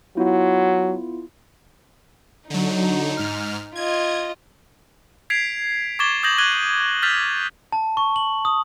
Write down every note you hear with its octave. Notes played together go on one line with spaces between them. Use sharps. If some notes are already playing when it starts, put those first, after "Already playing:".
F#3 B3 E4 F4
D3 F#3 D#4
G#2 F6
F4 D#5 G#6
G#6 B6 C7 D7 F7
C#6 D6 G#6 A6 E7 G7
D#6 G6 G#6 A#6 F#7
F#6 G#6 D#7 F#7 G7
F6 G6 A6 B6 F7
A5
C#6
F#7
D#6